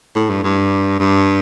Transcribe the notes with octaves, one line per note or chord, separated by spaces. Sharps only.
A2
G2
G2
G2